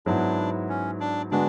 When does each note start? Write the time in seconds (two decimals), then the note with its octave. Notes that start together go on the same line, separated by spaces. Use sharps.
0.06 G#2 F#3 B3 D4 E4
0.69 C#4
1.00 D4
1.31 D3 G#3 B3 D4 F#4